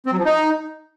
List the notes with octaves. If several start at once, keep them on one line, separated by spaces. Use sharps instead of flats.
C4
F#3
F3
D#4